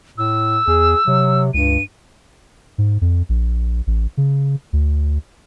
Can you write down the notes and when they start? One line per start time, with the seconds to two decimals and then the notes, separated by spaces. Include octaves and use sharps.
0.18 A2 E6
0.67 E2 G#4
1.07 C3 F#3
1.54 C#2 G2 D#7
2.78 G#2
3.01 F2
3.29 A#1
3.87 A1
4.17 C#3
4.73 D2